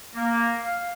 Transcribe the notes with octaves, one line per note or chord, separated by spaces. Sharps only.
A#3
F5